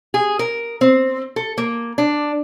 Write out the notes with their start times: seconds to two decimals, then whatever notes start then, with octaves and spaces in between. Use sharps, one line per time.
0.14 G#4
0.39 A#4
0.81 C4
1.36 A4
1.58 A#3
1.98 D4